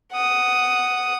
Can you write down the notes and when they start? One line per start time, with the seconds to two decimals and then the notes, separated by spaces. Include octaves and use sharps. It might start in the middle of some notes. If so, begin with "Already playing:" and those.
0.12 F#5 D#6